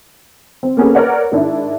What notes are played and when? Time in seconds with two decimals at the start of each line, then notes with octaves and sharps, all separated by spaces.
0.63 C4
0.77 A#3 B3 C#4 G#4 A4 B4
0.95 A#4 B4 C#5 D5 F#5
1.32 G#2 D#3 D4 E4